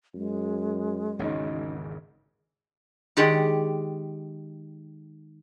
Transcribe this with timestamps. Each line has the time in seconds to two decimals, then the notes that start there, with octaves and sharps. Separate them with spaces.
0.15 F#2 G#3
1.19 G#1 E2 C#3 C#4 D#4
3.17 D#3 G#3 G4 D5 F#5